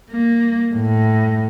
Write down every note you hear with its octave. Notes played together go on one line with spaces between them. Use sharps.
A#3
A2